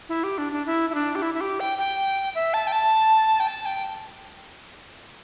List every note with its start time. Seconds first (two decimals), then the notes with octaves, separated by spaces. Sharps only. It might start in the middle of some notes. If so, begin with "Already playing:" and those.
0.09 E4
0.24 G4
0.38 D4
0.52 D4
0.66 E4
0.90 E4
0.95 D4
1.15 G4
1.22 E4
1.34 E4
1.41 G4
1.60 G5
1.78 G5
2.35 E5
2.54 A5
2.67 G5
2.72 A5
3.40 G5
3.47 A5
3.66 G5